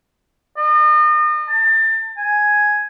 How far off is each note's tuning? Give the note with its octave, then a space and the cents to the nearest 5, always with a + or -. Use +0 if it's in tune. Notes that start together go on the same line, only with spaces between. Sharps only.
D#5 -40
A5 +30
G#5 +5